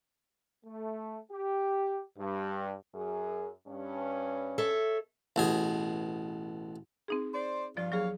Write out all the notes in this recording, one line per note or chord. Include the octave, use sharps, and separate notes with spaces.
A3
G4
G2
F#2 G#4
G2 C#4
A4 C#5 E5
A1 B2 G#4
C4 D#4 G#4
C5 D5
G2 F3 F4 D5
D#2 F#3 G#4 C#5 F5